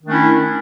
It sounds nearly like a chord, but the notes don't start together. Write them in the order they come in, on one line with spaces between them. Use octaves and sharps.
D#3 D4 A3 C#4 E4